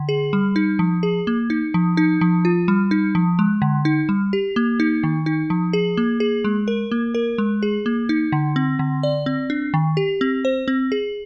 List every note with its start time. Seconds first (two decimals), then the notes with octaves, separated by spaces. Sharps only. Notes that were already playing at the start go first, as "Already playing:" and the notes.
Already playing: D3
0.09 G#4
0.33 G3
0.56 D#4
0.79 F3
1.03 G#4
1.27 A#3
1.50 D#4
1.74 F3
1.97 D#4
2.21 F3
2.45 F4
2.68 G3
2.91 D#4
3.15 F3
3.39 G#3
3.62 D3
3.85 D#4
4.09 G3
4.33 G4
4.56 A#3
4.80 D#4
5.03 D#3
5.26 D#4
5.50 F3
5.73 G#4
5.97 A#3
6.20 G#4
6.44 G#3
6.68 A#4
6.91 A#3
7.15 A#4
7.38 G#3
7.63 G#4
7.86 A#3
8.09 D#4
8.32 D3
8.56 C4
8.79 D3
9.03 D5
9.26 C4
9.50 D4
9.74 D#3
9.97 G4
10.21 C4
10.45 C5
10.68 C4
10.92 G#4